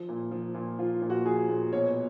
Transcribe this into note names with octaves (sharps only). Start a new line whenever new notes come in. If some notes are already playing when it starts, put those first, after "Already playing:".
Already playing: F3
A#2
F3
A#2
F3 F4
A#2
F#4
F3 G#4
A#2
B2 C#5